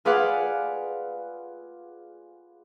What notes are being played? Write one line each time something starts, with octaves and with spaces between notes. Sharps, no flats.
F4 G#4 B4 D5 F5 F#5